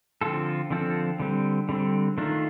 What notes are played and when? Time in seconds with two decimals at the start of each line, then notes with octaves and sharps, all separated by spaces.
0.21 D3 F3 C4 F4 A4
0.70 D3 F3 C4 F4 A4
1.20 D3 G3 C4
1.69 D3 G3 C4
2.18 D#3 A3 D4 F4